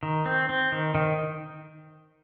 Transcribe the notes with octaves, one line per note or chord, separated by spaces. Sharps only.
D#3
C4
C4
D#3
D#3